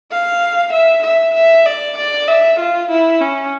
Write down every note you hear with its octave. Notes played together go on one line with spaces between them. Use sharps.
F5
E5
E5
E5
D5
D5
E5
F4
E4
C#4